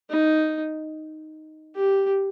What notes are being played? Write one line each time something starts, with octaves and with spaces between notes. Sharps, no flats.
D#4
G4